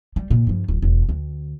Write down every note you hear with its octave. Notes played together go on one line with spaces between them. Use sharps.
G3
A#2
G2 F3
D1
E1
D2